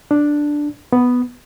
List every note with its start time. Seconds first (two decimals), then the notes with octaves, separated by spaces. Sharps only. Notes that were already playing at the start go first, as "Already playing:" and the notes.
0.11 D4
0.93 B3